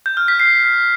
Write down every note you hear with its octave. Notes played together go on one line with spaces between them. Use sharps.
G6
F6
B6
C7